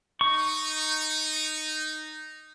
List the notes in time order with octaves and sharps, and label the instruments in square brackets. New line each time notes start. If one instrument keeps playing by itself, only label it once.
[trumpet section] D#4 [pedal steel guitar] C#6